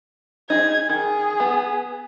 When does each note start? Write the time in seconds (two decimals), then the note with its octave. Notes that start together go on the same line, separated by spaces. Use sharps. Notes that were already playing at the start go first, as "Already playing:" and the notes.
0.50 D#4 G#4 G#6
0.89 D#3 G#4
1.40 B3